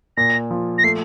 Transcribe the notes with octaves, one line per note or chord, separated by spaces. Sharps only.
A#2 A#6
F3
A#6
A3 C7